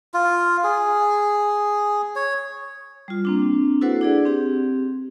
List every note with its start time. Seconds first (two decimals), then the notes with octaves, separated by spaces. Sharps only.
0.14 F4
0.64 G#4
2.16 C#5
3.08 G3 F4
3.25 A#3 C4 D4
3.81 E4 F#4 A4 B4 C5 F#5
4.01 D4 G#4 D5
4.26 C4 G4